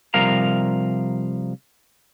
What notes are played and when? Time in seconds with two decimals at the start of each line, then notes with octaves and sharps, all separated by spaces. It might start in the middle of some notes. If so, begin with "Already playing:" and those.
0.14 C3 F3 G3 A#4 F5 A#5